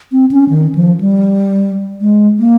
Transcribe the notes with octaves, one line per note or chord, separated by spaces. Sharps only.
C4
C#4
D#3
F3
G3
G#3
A#3